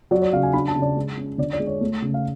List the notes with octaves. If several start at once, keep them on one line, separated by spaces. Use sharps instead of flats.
F#3 D5
D5
C#3 F5
G#5
D4 B5
A5
C#3
D5
G#3
C#4
D3 D5
D5
G#3
C#5
A3
C#3
F5